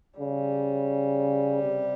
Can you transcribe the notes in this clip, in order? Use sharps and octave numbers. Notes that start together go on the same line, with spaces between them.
C#3 G3
C3